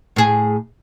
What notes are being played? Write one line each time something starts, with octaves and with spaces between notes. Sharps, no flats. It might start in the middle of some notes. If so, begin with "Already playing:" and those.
A2 G#4